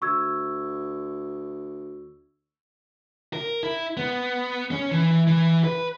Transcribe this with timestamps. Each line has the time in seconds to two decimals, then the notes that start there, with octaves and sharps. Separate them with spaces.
0.02 D2 C#6 E6 G#6
3.33 A#4
3.63 E4
3.97 B3
4.72 C#4
4.91 E3
5.27 E3
5.64 B4